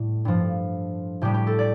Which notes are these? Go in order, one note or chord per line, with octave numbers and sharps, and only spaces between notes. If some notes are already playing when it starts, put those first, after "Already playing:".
Already playing: A2 G3
G2 F3
A2 G3 G4
G4
A4
D5